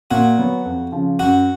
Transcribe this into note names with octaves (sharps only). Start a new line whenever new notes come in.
A#2 F#4
F#3 B3
F2
C#3 F3
F#2 F#4